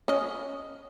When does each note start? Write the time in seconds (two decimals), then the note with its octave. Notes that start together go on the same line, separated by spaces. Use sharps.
0.08 C#4 D#5